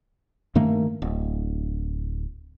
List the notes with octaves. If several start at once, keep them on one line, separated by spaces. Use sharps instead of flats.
G2 D#3 A3 A#3
D1